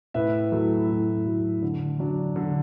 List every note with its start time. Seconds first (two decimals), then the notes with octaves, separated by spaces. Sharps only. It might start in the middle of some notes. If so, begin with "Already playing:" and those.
0.14 A2 B4 E5
0.52 F#3 A3 E4
0.89 A2
1.26 F#3 A3 E4
1.62 D3
1.99 F#3 D4
2.36 D3